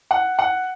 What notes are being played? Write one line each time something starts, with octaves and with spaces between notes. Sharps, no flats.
F#5
F#5